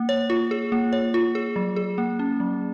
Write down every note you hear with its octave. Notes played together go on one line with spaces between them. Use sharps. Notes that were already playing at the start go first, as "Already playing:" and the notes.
Already playing: A#3
C#5
F4
G#4
A#3
C#5
F4
G#4
F#3
G#4
A#3
C#4
F#3